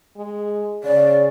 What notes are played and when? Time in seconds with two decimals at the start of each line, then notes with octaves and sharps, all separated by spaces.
0.16 G#3
0.84 C#3 D5